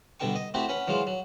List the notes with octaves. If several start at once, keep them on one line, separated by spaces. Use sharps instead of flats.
G2 B2 D3 A4 G5 C#6
D#5
A3 C4 E4 F#4 G4 A4
C#4 B4 F#5
E3 F#3 G#3 F4 C5
F#3